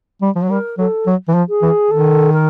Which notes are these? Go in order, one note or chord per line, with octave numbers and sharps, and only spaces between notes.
G3
F3
F#3
G3 A#4
F#3 A4
F#3
E3
F3
G#4
E3
D#3 A4
A#4